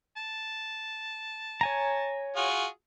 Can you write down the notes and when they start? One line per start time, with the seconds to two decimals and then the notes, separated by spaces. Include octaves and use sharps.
0.17 A5
1.61 C#5 G#5 A#5
2.36 F4 F#4 G#4